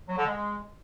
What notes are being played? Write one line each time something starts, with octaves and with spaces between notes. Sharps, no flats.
F#3
D3
G#3